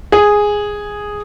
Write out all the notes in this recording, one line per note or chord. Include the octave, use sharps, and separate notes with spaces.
G#4